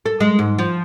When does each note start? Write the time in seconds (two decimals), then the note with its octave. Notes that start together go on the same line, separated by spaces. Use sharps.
0.06 A4
0.20 G#3
0.39 G#2
0.59 F3